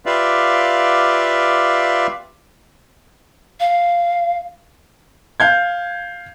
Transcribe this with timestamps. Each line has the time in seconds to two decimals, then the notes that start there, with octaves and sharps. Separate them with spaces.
0.06 F4 G4 B4 D5 E5 F5
3.60 F5
5.40 F5 G6 G#6